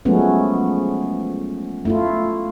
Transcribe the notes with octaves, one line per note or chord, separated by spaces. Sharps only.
F3 F#3 G#3 A3 B3 C#4
A3 E4 F4